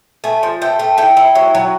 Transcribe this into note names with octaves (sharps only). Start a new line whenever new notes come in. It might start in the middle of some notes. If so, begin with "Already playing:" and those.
A3 G#5
F3
A3 G5
A3
E4 G5
E4
F#3
F#3